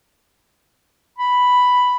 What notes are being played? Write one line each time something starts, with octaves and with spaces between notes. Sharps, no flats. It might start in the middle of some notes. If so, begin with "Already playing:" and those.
B5